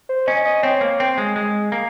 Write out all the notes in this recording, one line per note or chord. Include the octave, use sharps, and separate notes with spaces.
C5
C#4 D#5
D#5
C4 C#5
A#3
C4
G#3
G#3
A#3